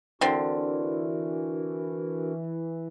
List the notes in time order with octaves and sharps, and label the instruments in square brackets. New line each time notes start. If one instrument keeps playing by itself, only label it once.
[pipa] D3 C4 [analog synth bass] E3 [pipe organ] D4 F#4 A#4